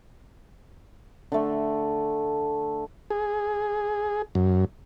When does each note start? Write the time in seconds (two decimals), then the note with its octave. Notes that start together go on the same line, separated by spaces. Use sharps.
1.32 D3 A3
3.11 G#4
4.35 F#2